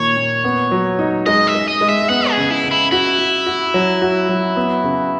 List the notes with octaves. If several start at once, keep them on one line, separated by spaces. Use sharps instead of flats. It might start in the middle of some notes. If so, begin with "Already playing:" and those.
Already playing: A#2 D#3 A#3 C#5
A#2
B3
F#3
D#4
G#3 D#5
E5
G#3
D#5
G#3
E5
B3 F#5
G#4
C#3
E4
C#3
E4
E4 F#4
F#4
F#4
F#3
F#4
F#3
B3
C#3